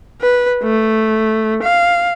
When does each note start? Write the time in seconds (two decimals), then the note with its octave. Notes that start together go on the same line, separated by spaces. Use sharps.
0.22 B4
0.64 A3
1.63 F5